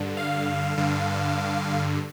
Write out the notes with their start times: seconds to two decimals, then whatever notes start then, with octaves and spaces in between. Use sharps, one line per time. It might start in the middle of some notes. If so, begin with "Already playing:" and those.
Already playing: G2 D3
0.17 F5
0.78 G2 D3